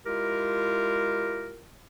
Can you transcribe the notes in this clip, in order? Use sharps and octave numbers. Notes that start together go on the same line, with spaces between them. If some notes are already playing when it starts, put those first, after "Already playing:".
G#3 E4 F4 G4 A#4